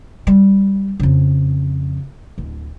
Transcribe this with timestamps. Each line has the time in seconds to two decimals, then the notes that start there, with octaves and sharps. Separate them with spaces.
0.27 G3
1.00 F2 C#3
2.38 D1